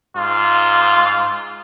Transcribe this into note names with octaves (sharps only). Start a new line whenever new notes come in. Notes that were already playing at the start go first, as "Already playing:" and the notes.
G#2 F4